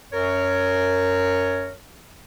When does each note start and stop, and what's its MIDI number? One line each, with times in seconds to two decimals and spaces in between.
0.12 1.72 42
0.12 1.72 70
0.12 1.72 73